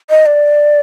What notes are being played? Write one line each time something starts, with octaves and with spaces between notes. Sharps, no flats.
D#5
D5